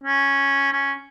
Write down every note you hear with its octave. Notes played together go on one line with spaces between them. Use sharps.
C#4
C#4